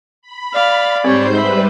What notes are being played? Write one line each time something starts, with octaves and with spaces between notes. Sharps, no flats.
B5
D5 F5
G#2 G3 C4 C5 C#5 G6
G3 B4 E5 B5